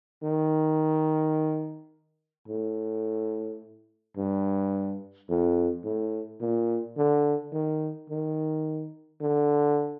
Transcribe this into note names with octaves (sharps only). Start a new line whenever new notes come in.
D#3
A2
G2
F2
A2
A#2
D3
D#3
D#3
D3